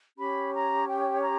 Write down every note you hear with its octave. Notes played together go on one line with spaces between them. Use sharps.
C#4 G4 C#5 B5
A#5
G5
A#5